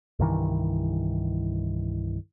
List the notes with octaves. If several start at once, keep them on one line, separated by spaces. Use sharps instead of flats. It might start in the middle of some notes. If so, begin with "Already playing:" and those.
C2 G2 D#3 E3